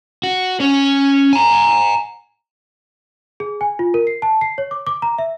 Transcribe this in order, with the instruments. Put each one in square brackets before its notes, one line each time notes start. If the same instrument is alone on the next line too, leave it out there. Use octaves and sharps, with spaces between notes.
[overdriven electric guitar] F#4
C#4 C#5
G#5 A#5
[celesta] G#4
G#5
F4
A#4
C7
A5
C7
C#5
D6
D6
A#5
E5